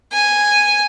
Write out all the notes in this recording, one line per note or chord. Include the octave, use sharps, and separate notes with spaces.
G#5